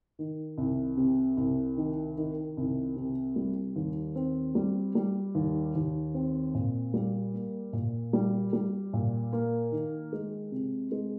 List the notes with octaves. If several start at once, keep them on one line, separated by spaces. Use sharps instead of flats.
D#3
C2
C3
C2
D#3
D#3
C2
C3
G3
D#2
C4
G3
G3
D#2
D#2
C4
A#2
G3
A#3
A#2
G3
G3
A#2
A#3
D#3
G#3
C3
G#3